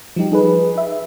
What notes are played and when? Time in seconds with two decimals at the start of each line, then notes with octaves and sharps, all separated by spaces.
0.16 F3 G3 D#4 G4
0.32 D#4 G#4 B4
0.78 E5